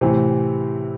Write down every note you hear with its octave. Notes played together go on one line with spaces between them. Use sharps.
A2 C3 E3 C4